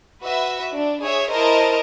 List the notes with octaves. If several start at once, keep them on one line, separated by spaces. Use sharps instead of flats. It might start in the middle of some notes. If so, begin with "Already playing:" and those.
F#4 B4 E5
D4
G#4 C#5 E5
E4 A#4 C5 D#5 A5 A#5